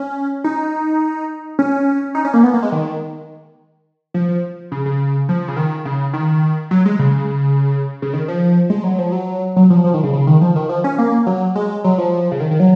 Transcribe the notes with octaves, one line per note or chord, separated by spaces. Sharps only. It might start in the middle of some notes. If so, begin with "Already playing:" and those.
Already playing: C#4
D#4
C#4
D#4
C#4
A#3
B3
A#3
G#3
D#3
F3
F3
C#3
C#3
F3
C#3
D#3
C#3
D#3
F#3
G#3
C#3
C#3
D#3
F3
G#3
F#3
F3
F#3
F#3
F3
F3
D#3
C#3
C#3
D#3
F3
D#3
F3
C#4
A#3
F#3
G#3
F#3
F3
C#3
D#3
D#3
F#3